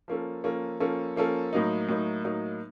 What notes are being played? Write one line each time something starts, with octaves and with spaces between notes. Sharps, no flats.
F3 A#3 C#4 A4
F3 A#3 C#4 A4
F3 A#3 C#4 A4
F3 A#3 C#4 A4
A2 F#3 A#3 D#4
A2 F#3 A#3 D#4
A2 F#3 A#3 D#4